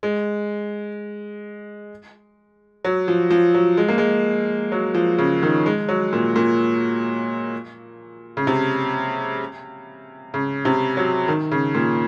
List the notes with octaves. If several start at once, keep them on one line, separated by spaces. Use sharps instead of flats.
G#3
F#3
F3
F3
F#3
G#3
A#3
G#3
F#3
F3
C#3
D#3
G#3
F#3
A#2
A#2
C#3
C3
C#3
C3
F#3
D#3
C#3
A#2